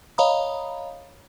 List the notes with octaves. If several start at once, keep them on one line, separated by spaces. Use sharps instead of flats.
C#5 D#5 F5 A#5 B5 D#6